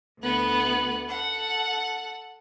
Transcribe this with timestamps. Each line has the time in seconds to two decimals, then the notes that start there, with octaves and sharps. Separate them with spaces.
0.20 D2 B3 F#6
1.09 A4 F#5